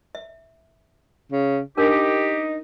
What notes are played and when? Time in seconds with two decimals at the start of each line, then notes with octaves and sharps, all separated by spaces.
0.15 E5
1.32 C#3
1.78 D4 D#4 G4 A#4